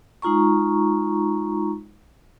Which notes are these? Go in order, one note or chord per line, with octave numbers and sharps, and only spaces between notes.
G#3 D#4 F4 A#5 C#6